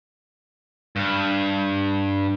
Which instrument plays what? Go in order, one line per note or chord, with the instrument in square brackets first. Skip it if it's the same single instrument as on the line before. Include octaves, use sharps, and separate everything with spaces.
[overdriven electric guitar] G2